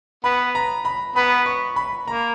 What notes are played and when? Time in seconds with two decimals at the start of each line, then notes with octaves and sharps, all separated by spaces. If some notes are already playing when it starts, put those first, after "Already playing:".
0.24 B3 B5
0.55 A#5
0.85 B5
1.16 B3 B5
1.46 C#6
1.76 B5
2.07 A#3 A#5